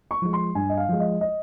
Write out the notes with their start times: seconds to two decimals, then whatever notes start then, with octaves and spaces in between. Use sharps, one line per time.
0.11 C#6
0.22 F3 G#3
0.33 C6
0.55 G2 G#5
0.69 D#5
0.77 F5
0.88 F3 G#3
1.00 D#5
1.21 D#5